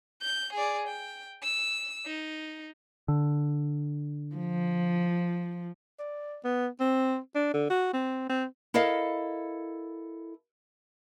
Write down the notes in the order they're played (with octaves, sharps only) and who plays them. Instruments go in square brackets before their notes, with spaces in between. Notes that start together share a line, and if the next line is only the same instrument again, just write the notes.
[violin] G6
G#4 D5
G5
E6
D#4
[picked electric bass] D3
[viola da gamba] F3
[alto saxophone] D5
B3
C4
D4
D3
F#4
C4
C4
[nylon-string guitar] E4 A4 A#4 D#5 F5